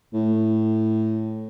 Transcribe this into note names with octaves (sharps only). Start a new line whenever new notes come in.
A2